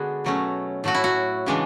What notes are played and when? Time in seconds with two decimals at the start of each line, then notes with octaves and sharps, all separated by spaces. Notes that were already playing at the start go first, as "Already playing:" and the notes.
Already playing: D3 G#3 B3 D4 F#4 G#4
0.25 B2 F#3 A3 C#4
0.84 A2 F#3 A3 F#4
0.95 E4
1.04 F#4
1.46 C#3 E3 G#3 D4